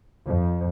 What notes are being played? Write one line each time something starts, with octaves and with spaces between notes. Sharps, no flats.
F2